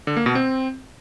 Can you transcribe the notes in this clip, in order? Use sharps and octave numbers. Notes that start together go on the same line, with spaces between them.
D3
A#3
B2
C4